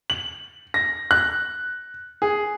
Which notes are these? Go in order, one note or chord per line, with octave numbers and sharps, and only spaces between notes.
F#7
A#6
F#6
G#4